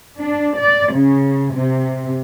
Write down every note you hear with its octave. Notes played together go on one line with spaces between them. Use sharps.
D4
D5
C#3
C3